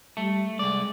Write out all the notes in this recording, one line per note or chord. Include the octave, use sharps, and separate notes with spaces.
G3 A3
C2 G#3 D5